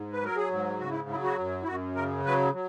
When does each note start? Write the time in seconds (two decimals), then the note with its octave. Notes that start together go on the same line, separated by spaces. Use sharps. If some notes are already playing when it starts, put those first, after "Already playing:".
Already playing: G#2
0.12 B4
0.22 F#3 A#4
0.36 G#4
0.51 G#2
0.79 C#3 F#4
0.90 E4
1.09 F#3 E4
1.23 F#4
1.38 F#2
1.63 E4
1.66 F#2 F#4
1.95 C#3 A#4
2.25 F#3 B4
2.53 F#3